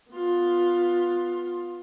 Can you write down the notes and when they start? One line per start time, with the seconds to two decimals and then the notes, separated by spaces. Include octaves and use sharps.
0.11 B3 F4